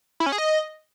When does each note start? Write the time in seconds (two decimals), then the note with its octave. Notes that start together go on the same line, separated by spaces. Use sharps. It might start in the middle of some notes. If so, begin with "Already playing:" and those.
0.20 E4
0.26 C#4
0.32 G#4
0.38 D#5